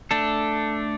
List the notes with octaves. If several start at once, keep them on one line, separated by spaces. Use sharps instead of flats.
A3 D4 A4